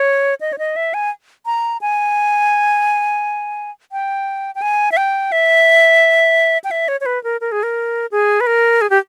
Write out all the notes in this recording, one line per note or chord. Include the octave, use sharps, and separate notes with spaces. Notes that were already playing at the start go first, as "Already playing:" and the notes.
Already playing: C#5
D#5
C#5
D#5
E5
G#5
A#5
G#5
G5
G5
G#5
E5
G5
E5
G5
E5
C#5
C#5
B4
A#4
A#4
G#4
A#4
G#4
B4
A#4
G#4
G4